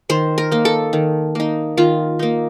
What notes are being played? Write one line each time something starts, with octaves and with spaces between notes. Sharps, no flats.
D#3 C5
A#4
A#3 D#4
A4
D#3
A#3 D#4
D#3 F4
A#3 D#4